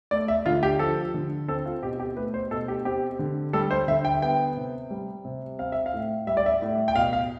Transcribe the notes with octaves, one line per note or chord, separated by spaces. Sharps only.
A3 D5
E5
D3 F4
G4
F3 A4
D3
C4 A4
F4
B2 G4
G4
A3 B4
C5
B2 A4
G4
C4 G4
D3
G3 A4
C5
D3 E5
G5
B3 G5
C3
G3
C3
C4 F5
E5
F5
A2
G3 E5
D5
E5
A2
G5
B2 F5
F5